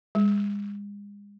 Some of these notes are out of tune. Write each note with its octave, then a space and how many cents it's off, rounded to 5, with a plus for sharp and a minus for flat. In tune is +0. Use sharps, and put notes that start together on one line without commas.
G#3 -40